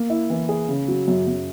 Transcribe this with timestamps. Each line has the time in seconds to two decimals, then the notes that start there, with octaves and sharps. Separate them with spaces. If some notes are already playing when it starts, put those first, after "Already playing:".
Already playing: A#3
0.10 E4
0.30 E3
0.49 G#4
0.68 C#3
0.88 F#3
1.08 F#2
1.27 F#2